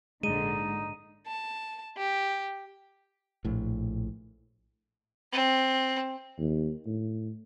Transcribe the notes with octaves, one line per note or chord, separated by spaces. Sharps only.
A#1 G#2 D3 G#3 D#4 D#7
A5
G4
A#1 A2
C4
D#2
A2